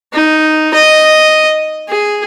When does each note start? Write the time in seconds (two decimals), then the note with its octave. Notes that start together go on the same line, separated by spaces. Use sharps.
0.13 D#4
0.74 D#5
1.89 G#4